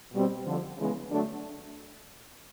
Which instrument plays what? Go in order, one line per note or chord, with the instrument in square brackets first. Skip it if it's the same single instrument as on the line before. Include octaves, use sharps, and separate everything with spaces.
[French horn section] B2 G3 C4
F2 D3 F3
C#3 E3 G#3 B3
D3 F#3 A3 D4